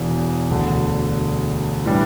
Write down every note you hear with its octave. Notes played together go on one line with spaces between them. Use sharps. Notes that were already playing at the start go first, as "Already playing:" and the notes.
Already playing: E1 E2 E3
E1 D2 D3
A2 E3 G3 D4